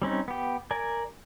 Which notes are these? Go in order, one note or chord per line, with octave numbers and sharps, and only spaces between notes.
G3 C4 C#4 D#4
B3 G4
A#4 D5 G#5